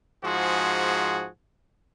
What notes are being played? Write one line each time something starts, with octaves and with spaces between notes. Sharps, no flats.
G#2 F3 F#4 G#4